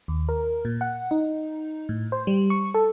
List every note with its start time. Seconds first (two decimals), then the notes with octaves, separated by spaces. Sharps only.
0.08 D#2
0.29 A#4
0.65 A#2
0.81 F#5
1.11 D#4
1.89 A2
2.12 C5
2.27 G3
2.50 C#6
2.74 A4